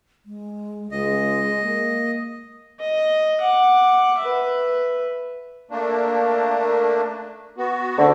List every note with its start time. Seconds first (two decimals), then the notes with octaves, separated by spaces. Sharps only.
0.26 G#3
0.91 C#2 G#3 D#5
1.62 A#3
2.80 D#5
3.41 F#5 D6
4.19 B4 E5
5.71 A3 A#3 D4
7.58 B3 F#4
7.98 D2 D3